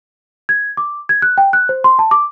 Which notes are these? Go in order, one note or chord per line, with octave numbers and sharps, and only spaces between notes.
G#6
D6
G#6
F#6
G5
F#6
C5
C6
A5
D6